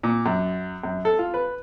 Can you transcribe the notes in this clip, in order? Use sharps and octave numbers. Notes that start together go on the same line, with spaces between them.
A#2
F#2
F#2
A4
F4
B4